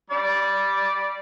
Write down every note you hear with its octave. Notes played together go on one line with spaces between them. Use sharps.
G3 D5